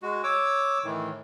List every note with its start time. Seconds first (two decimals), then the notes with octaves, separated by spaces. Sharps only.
0.03 G#3 F#4
0.23 C#5 D6 E6
0.84 A2 D#3 E3